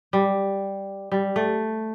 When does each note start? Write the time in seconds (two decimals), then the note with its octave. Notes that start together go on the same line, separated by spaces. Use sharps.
0.13 G3
1.12 G3
1.36 A3